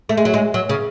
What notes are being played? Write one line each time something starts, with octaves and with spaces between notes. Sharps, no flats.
A3
G#3
F#3
G#3
F#3
C#3